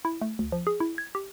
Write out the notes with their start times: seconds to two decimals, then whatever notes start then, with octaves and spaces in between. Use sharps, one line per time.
0.05 E4
0.22 A3
0.39 D2
0.52 F3
0.67 G#4
0.80 E4
0.98 G#6
1.15 G4